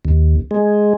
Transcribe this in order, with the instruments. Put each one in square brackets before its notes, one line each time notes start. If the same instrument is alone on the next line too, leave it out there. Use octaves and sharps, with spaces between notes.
[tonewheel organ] D#2
G#3